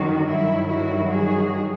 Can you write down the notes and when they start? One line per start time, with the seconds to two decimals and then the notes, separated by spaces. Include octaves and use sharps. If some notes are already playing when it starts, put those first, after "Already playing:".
Already playing: F#2 D#3 F#3 F#4
0.29 G2 D#3 F#3 E4
0.70 E4 F#4
1.11 F#4 G#4